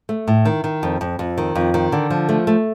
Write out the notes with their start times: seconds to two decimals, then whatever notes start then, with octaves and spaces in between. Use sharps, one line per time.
0.09 A3
0.28 A2
0.45 D#3
0.64 D#3
0.83 F2
1.01 F2
1.19 F2
1.38 D#3
1.55 F2
1.74 D#3
1.92 D3
2.10 F3
2.29 A3
2.47 A3